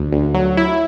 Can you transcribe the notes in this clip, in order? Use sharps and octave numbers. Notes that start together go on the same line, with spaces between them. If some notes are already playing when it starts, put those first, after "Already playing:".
Already playing: D2
D2
F#3
E4